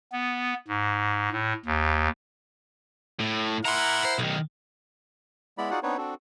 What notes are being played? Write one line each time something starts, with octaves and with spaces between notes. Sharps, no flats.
B3
G#2
A2
D#2
A2
E4 A#4 F#5 A#5 C6
C5
B1 D#3
G#3 B3 E4 D5 B5
D#4 F4 F#4 G#4 D5 F#5
B3 C4 D4 D#4 B4 C#5
C4 D4 F#4 A4